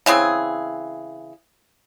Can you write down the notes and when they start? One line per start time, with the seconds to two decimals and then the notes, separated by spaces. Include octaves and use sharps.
0.06 C#3 E3 C4 G#4